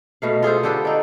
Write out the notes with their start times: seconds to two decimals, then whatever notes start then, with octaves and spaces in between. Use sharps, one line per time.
0.22 B2 A3 F5
0.43 F4 G#4 A4 C5
0.63 D3 G4 A4 B4
0.85 D4 D#4